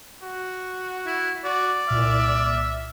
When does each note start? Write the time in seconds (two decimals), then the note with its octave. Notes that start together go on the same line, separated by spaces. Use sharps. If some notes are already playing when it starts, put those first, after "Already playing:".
0.23 F#4
1.06 E4
1.45 F#4 D5
1.88 C2 A#2 E5 F6